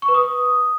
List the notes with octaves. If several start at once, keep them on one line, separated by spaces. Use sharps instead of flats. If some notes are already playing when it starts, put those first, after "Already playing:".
C#6
B4
D#6